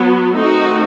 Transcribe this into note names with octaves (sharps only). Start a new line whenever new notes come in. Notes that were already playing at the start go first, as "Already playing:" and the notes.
Already playing: F#3 B3
D#3 A3 C4 D#4 F#4